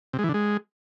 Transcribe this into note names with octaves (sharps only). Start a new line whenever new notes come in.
C3
G#3
E3
D3
G#3